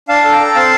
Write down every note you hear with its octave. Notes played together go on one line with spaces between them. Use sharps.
D4 F5 A5
A4
G5 A#5
A4
C4 F5 A5